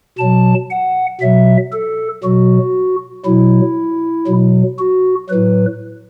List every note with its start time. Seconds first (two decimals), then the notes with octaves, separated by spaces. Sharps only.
0.19 B2 F#3 A5
0.70 F#5
1.21 B2 F#3 E5
1.72 A4
2.24 B2 F#3 F#4
3.26 B2 F#3 E4
4.27 B2 F#3
4.79 F#4
5.30 A2 F#3 B4